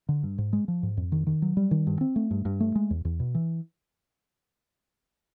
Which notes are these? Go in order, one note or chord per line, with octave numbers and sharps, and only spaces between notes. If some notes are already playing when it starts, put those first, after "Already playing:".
D3
G2
G#2
G#3
F3
G#2
F2
D#3
D#3
F#3
G3
D#3
G2
C4
A3
G2
G2
A3
G#3
E2
E2
B2
E3